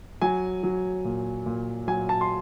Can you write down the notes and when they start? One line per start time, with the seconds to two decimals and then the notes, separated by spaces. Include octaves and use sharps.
0.22 F#3 G#5
0.63 F#3
1.05 A#2
1.46 A#2
1.88 F#3 G#5
2.09 A5
2.21 C6